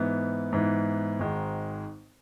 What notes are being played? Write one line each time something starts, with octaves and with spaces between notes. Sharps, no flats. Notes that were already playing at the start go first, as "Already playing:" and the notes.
Already playing: G#2 E3 B3
G#2 E3 B3
G#1 G#2 D#3 G#3